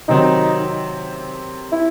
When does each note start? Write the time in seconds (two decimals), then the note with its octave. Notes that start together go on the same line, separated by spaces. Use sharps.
0.08 C3 D#3 F#3 C4 D#4
1.72 E4